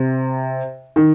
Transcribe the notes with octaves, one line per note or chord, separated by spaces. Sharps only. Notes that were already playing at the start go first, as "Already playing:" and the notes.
Already playing: C3
D#3